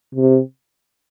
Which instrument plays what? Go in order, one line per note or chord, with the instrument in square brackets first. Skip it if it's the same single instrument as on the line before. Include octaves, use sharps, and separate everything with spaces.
[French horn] C3